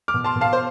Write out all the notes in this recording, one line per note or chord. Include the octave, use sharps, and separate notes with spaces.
D6 F6
B2
A5 C6
B2
F5 A5
C5